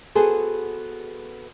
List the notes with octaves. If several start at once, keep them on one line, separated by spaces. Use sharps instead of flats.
B3 F#4 G#4 A4 C5